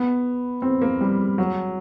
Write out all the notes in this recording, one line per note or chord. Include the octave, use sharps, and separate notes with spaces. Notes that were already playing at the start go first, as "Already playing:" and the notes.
Already playing: B3
C4
A#3
G3
F#3